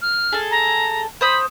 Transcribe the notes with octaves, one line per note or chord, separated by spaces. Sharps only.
F6
G#4 A4
A#5
C5 B5 D#6 G6